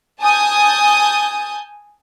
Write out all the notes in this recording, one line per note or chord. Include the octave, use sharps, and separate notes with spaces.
G#5 A5 D#6 G6